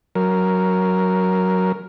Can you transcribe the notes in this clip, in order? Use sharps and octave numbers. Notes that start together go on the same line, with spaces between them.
F#3 A#4